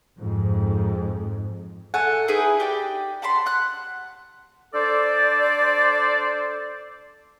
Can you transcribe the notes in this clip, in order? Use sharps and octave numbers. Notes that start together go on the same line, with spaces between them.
F2 G#2
A3 F#5 G#5
D#4 E4 G#4 B4
G4 D5 G5
F#5 A5 B5 C6
F#5 F#6
D4 A4 C5 D5